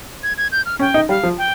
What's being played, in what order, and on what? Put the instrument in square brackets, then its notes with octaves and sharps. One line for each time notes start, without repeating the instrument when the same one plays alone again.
[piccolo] G#6
G#6
G6
F6
[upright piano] C#4 [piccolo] G5
[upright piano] D#4
[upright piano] G3 [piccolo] F5
[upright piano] F3
[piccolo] G5